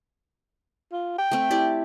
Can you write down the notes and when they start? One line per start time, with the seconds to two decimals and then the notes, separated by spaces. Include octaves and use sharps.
0.92 F4
1.18 G5
1.31 A3 C4
1.51 E4 G4 D5